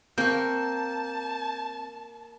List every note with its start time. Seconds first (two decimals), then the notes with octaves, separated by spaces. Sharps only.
0.18 A#3 C4 A5 C#6 G6